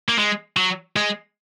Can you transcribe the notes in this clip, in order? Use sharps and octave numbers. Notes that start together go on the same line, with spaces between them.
A#3
G#3
F#3
G#3